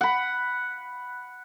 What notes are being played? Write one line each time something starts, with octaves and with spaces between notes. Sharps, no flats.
F#5 B5